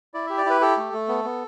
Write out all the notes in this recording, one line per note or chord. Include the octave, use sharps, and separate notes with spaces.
E4 D5
G4 E5
D5
E4 B4
G4 A4
A3
A3
B3
B3